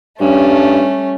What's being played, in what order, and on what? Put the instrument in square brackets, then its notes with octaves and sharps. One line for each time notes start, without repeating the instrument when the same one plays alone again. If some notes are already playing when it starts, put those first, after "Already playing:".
[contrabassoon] G2 [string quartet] G3 A3 C#4